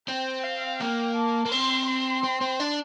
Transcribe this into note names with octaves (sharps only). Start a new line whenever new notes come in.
C4 G5
F5
A#3 G5
A5
A#3
C4 C6
C6
C4
C4
D4